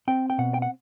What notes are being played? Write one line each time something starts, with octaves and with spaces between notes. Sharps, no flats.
C4 G5
G5
B2 F#5
G5
F#5